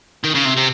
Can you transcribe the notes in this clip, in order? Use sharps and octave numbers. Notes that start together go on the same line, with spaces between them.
D#3
C#3
C3
C3